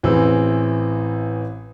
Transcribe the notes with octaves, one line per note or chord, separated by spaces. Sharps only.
A1 E3 C4 G#4 E6